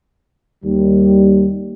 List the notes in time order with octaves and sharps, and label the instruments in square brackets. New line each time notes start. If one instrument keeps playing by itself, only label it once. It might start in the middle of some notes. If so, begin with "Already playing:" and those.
[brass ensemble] D#2 G3